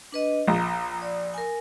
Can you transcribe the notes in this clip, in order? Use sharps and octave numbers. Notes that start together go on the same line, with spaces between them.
D4 B4 D#5
A#1 A#5
D5
A#4 G#5